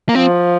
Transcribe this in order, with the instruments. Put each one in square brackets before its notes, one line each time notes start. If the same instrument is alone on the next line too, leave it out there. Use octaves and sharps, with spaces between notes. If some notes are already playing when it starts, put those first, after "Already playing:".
[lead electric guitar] A#3
[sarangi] F3 [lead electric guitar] C4